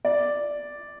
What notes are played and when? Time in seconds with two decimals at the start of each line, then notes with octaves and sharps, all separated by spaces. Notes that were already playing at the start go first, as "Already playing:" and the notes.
0.05 D5